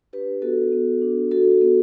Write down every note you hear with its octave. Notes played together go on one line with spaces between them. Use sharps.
D4 G4 B4
B3 F#4 A4
B3
D4
F#4 A4
B3